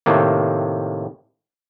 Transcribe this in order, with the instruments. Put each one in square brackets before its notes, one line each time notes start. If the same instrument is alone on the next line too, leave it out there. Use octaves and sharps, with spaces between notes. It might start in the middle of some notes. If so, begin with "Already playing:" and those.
[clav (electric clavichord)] A2 C3 D#3 A#3